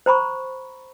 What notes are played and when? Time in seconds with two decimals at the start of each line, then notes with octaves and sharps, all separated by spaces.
0.06 C5 A#5 B5 C#6